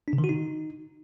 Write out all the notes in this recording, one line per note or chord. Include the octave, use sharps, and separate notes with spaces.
D4
C#3
D#3
F#4
D#4